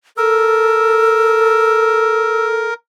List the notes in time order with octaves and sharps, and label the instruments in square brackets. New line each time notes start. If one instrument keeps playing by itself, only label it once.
[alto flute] A4 [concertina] A#4 [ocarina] E6